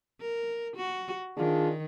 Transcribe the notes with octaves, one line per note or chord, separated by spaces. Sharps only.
A#4
F#4
D#3 D4 F4 G#4